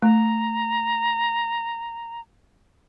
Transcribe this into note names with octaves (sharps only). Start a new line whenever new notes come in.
A3 A#5